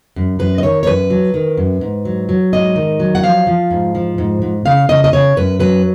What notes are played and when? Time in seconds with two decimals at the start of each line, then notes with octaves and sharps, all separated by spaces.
0.16 F#2
0.39 F#2 B4
0.58 D#5
0.63 D#3 C#5
0.83 C#5
0.87 F#2 B4
1.10 F#3
1.34 D#3
1.57 F#2
1.81 G#2
2.05 F#3
2.29 F#3
2.53 G#2 D#5
2.76 D#3
3.00 F#3
3.15 F#5
3.23 F3 F5
3.47 F3
3.71 G#2
3.95 F3
4.18 G#2
4.42 G#2
4.65 C#3 F5
4.89 C#3 D#5
5.04 D#5
5.13 C#3 C#5
5.36 F#2 B4
5.60 F#3 B4